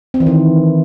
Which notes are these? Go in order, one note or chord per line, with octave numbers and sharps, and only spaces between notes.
C4
E3
D#3